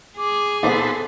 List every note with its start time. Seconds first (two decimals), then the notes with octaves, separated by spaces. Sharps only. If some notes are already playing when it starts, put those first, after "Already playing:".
0.18 G#4 D6
0.63 D#2 F3 B3 A4 B4 C5